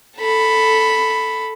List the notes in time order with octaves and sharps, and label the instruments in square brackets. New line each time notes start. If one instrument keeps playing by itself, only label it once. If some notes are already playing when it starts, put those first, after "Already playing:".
[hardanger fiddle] A4 B5